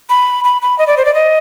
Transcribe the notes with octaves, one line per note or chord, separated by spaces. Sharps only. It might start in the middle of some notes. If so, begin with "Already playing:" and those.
B5
B5
B5
D#5
D5
C5
D5
D#5